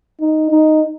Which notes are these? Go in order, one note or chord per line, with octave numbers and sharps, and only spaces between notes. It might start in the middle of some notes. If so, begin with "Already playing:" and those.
D#4
D#4